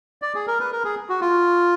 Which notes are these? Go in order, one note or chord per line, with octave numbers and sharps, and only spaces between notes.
D5
G#4
A#4
B4
A#4
G#4
F#4
F4